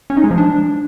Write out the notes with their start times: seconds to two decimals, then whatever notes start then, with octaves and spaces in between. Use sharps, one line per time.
0.10 C#4
0.17 D#4
0.24 G#3
0.31 F3
0.38 D4